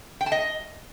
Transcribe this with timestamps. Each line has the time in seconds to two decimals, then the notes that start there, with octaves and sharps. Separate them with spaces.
0.21 G5
0.26 A5
0.32 D#5